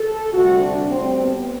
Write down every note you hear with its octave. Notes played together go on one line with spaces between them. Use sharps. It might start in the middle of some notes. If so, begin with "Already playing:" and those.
Already playing: A4
D2 C3 G3 F#4
D4
A2 G3 C4
B3